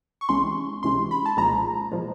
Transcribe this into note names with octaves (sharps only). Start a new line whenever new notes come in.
C#6
C#2 C3 E3 G#3 C#4 C6
C#2 C3 E3 G#3 C#4 C6
B5
A5
C2 A#2 F3 G#3 A#5
A#2 F3 G#3